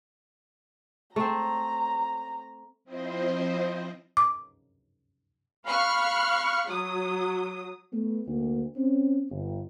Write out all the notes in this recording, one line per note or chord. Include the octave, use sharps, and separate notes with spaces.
A3 C4 A#5
F3 C4 E4 C5 D#5
D6
F5 B5 C#6 F6 F#6
F#3 D#6
A3 B3
D2 A#3 D4
C4 C#4
G1